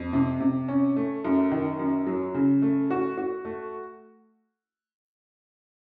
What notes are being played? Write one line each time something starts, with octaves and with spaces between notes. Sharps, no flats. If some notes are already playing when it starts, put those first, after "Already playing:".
Already playing: F2
C3
C3
C#4
A3
F#2
D#3
F#2
F#3
C#3
A3
F#4
F#4
A3